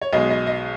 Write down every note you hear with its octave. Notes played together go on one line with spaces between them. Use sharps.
C#5
B1 B2 G#3 D#5
D#5
D#5